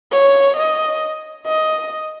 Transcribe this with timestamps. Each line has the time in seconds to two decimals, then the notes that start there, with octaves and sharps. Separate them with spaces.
0.12 C#5
0.57 D#5
1.46 D#5